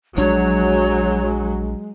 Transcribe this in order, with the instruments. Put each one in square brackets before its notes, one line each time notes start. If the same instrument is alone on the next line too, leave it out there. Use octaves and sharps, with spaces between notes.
[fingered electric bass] A#1 D4 [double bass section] F#3 [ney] G#3 [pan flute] C#5